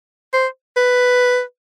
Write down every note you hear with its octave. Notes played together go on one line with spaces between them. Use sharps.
C5
B4